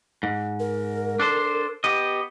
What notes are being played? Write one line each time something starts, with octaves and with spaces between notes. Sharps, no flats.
G#2
A#4
D4 A4 C5
B3 G4 D#5